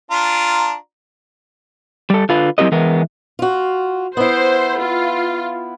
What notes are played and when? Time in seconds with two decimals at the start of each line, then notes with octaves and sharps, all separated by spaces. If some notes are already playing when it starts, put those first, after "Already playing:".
0.11 D4 F4 A#5
2.10 G3 A4
2.29 D3 F4 B4
2.58 F#3 C4 E4 G4 A#4 D#5
2.72 E3 G#3 B3 A#4
3.39 F4 F#4
4.17 B3 E4 C5
4.81 F4